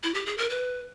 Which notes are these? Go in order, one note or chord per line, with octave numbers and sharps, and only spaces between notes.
E4
G4
G#4
A#4
B4